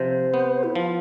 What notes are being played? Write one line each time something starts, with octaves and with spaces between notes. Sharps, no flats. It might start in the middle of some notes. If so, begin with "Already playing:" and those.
Already playing: C3 F3 C5
B3
E4
F3 F4